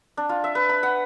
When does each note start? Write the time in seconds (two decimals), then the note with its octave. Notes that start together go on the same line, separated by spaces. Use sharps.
0.17 D4
0.29 F4
0.44 E5
0.55 B4
0.69 B5
0.83 F#5